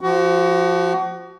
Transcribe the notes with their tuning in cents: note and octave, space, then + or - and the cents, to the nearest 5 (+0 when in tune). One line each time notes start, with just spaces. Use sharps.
F3 -5 F#4 +30